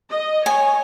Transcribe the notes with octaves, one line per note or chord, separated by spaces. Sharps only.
D#5
C#5 G#5